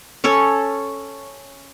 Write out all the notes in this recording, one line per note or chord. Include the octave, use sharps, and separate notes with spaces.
C#4 A4 C#5